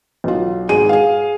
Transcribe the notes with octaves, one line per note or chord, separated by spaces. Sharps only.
B1 F4
G#1 G#2 G#4 D#7
G#4 F5